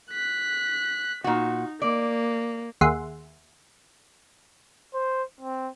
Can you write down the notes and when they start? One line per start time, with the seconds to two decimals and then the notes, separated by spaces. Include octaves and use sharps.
0.11 F#6 B6
1.24 A#2 D#4 F#4
1.82 A#3 D5
2.81 D#2 G#4 E5 F#5 C6
4.94 C5
5.41 C4